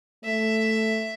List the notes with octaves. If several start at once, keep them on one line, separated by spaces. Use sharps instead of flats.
A3 E5